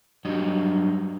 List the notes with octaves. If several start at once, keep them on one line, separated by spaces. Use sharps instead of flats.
G2 F#3 D#5